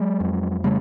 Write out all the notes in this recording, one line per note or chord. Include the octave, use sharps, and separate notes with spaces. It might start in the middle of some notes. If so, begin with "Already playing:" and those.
Already playing: F#3 G#3
F2
C#3 G3 A3